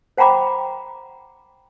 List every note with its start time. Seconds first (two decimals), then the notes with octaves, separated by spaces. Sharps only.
0.17 C5 F#5 G5 A#5 B5 D6